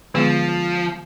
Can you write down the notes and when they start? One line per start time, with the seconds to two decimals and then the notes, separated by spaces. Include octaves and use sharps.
0.14 D3 F3 G#3 B3 F4 G#4